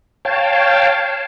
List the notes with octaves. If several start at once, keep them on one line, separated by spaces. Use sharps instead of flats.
C#5 F5 G5 A5